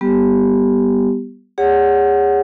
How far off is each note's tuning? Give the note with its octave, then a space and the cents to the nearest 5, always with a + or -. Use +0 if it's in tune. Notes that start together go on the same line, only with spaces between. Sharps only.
G3 +0 B3 -10 G4 +0
G#4 -35 C#5 +10 F#5 +0